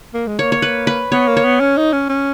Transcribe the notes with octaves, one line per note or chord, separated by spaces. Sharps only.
A#3
G#3
A#3 C#5
C#5
B4
B4
B3 C#5
A#3
C#5
B3
C#4
D#4
C#4
C#4